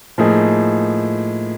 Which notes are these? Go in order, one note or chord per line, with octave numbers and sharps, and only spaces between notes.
A2 F3 A#3 D#4 G#4